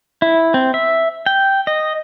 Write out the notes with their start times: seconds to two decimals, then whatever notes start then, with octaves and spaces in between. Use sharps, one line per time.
0.22 E4
0.54 C4
0.74 E5
1.26 G5
1.67 D#5